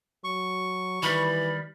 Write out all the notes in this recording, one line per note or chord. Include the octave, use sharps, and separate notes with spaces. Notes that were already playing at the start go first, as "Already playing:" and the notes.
F#3 C#6
D#3 E3 G3 B5